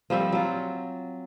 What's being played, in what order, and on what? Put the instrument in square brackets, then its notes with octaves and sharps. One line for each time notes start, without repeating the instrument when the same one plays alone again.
[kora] F3 G3 C4 E5
F#3 F4